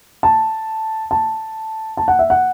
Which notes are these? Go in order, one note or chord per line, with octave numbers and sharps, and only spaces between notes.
A5
A5
A5
F#5
E5
F#5